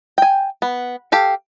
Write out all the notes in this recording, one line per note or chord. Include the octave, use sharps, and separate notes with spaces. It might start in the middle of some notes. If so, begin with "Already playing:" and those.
G5 G#5
B3
G4 A4 F5